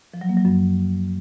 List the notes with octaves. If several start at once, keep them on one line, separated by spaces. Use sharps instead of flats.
F3
F#3
A#3
F#3
F#2